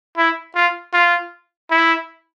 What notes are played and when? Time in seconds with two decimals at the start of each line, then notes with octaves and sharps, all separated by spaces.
0.18 E4
0.55 F4
0.93 F4
1.71 E4